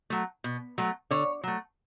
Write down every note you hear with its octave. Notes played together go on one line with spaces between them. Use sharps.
F#3 A3
B2
F#3 A3
D3 C#5
F#3 A3